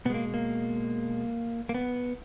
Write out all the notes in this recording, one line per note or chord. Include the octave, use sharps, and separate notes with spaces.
B2 G#3 A#3 B3
A#3
A#3
B3